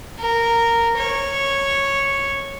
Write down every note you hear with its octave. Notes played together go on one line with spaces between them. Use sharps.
A#4
C#5